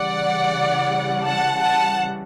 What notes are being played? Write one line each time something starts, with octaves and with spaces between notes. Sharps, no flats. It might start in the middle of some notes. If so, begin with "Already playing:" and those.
Already playing: C#3 E3 G3 D5 F#5
F#5 A5
F#5 A5